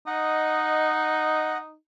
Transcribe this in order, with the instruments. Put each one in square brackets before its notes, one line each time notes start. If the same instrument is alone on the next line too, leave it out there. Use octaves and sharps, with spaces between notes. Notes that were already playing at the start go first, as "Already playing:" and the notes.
[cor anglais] D#4 [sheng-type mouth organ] D#5 F#5